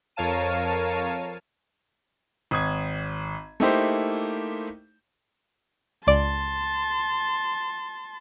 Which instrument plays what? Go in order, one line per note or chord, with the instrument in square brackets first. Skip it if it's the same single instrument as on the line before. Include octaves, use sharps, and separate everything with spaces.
[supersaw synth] F2 A#4 C#5 F5 A5 D#7
[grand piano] G#1 D#6 G#6
A3 A#3 D#4 E4 G4 C5
[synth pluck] C#2 D5 [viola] A5 C6